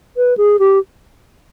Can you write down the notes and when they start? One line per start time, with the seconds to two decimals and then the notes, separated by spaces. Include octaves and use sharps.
0.17 B4
0.37 G#4
0.59 G4